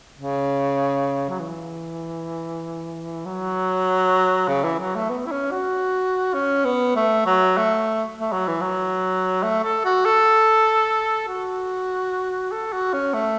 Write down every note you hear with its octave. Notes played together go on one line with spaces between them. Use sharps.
C#3
F#3
E3
F#3
C#3
E3
F#3
A3
B3
E4
C#4
F#4
C#4
B3
A3
F#3
A3
A3
F#3
E3
F#3
A3
A4
F#4
A4
F#4
A4
F#4
C#4
A3